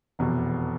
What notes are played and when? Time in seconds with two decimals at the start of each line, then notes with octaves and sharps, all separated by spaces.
0.19 F1 E2 B2 B3